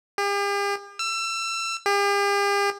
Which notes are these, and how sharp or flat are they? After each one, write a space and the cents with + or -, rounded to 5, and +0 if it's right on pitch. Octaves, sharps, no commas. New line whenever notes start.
G4 +45
E6 +30
G4 +45